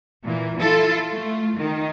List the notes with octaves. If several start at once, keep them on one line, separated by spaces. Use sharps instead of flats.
A#2 E3
E4 F4 A4
A3 F4
D#3